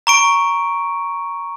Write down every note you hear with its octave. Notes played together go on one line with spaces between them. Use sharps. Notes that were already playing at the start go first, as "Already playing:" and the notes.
A#5 C#6 D7